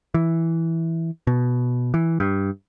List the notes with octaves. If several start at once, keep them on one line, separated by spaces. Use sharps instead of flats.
E3
B2
E3
G2